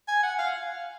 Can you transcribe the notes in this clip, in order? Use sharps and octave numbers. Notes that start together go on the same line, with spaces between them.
G#5
F#5
F5